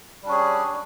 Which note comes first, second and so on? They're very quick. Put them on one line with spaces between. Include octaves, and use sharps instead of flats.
G3 D4 C#4 G#4